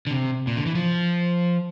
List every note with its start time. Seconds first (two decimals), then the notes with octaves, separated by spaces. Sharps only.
0.07 D3
0.11 C3
0.47 A#2
0.57 D3
0.66 E3
0.75 F3